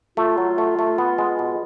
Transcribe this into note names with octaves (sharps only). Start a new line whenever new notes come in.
A3 F4
F#3
A3
A3
B3
G#3
B2